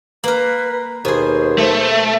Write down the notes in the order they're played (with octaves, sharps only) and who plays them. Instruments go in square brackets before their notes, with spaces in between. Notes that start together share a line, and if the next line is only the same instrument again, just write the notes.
[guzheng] A#3 A#4 [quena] B4
[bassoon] D#2 [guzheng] B2 G#4 [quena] C5
[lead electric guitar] A3